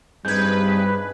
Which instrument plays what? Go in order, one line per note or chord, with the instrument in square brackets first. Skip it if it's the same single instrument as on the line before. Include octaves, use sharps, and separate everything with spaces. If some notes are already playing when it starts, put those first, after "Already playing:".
[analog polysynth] G2 B4 [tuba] G3 [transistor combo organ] C4 D#4 G#4 [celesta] G6 G#6